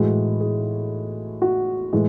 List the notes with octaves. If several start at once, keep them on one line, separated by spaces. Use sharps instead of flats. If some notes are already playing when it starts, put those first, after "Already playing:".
Already playing: A2 E3 G#3 F#4
G#4
F#4
A2 E3 G#3